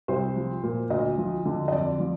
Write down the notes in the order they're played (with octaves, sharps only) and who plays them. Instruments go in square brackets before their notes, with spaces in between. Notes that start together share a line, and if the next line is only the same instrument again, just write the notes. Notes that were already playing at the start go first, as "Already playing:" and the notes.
[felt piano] C2 C5
F3
A#2
D2 D#5
F3
D3
D#5
F2 D5
F3